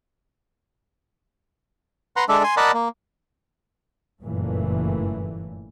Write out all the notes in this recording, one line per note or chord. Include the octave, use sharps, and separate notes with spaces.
B4 F#5 A#5 C6
G#3 D4 A4 D5 E5
G#5 C6
A#4 D5 D#5 F#5 A5 B5
A#3
F#1 G2 A#2 E3 A3